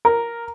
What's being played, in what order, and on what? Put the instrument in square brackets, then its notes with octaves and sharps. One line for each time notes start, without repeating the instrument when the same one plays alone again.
[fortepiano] A#4